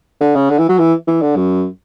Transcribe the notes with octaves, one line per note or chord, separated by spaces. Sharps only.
D3
C#3
D3
E3
F#3
E3
E3
D3
F#2